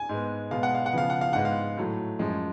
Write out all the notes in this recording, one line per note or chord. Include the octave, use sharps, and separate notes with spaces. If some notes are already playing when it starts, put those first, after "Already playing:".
Already playing: G#5
G#2 G#3 B3
B2 G#3 B3 F5
F#5
F5
F#5
C#3 F3 B3 F5
F#5
F5
G#2 G#3 B3 F#5
F5
A2 F#3 A3
F#2 F3 G#3